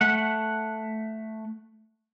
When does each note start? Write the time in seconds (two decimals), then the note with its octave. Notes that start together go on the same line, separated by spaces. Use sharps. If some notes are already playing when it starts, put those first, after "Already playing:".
0.01 A3 F#5